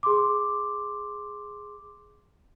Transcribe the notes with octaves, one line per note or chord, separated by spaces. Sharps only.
G#4 C6 D6